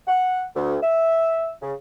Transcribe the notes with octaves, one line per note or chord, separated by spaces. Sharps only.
F#5
D2
E5
C#3